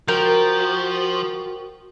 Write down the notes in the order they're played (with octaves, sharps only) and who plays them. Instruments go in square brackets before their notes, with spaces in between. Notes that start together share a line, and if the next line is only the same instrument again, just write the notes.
[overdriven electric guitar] F3 [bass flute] F#4 [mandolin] A#4 G5